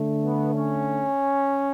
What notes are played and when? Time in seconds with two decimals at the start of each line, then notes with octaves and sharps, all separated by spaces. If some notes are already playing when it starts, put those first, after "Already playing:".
Already playing: D3 A3
0.23 B3
0.52 C#4